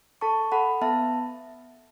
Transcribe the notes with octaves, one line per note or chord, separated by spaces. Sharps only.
A4 A5 C#6
A4 F#5 B5
B3 E5 A5